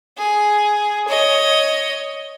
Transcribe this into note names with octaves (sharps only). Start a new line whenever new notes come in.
G#4
C#5 D#5